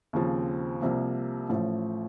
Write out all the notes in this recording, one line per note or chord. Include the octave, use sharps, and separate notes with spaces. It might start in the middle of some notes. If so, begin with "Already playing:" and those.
D#2 C#3 F3 C4
C2 C3 F3 A#3
A1 A2 F3